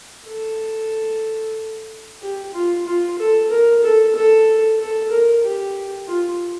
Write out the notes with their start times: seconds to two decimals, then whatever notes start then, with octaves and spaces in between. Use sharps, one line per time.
0.28 A4
2.22 G4
2.54 F4
2.86 F4
3.19 A4
3.50 A#4
3.83 A4
4.15 A4
4.80 A4
5.11 A#4
5.44 G4
6.08 F4